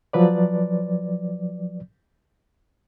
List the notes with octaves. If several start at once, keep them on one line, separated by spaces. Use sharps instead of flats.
F3 F#3 B4 D5